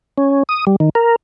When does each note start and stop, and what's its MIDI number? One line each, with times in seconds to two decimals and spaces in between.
0.18 0.43 61
0.49 0.65 87
0.67 0.76 55
0.80 0.89 51
0.95 1.16 70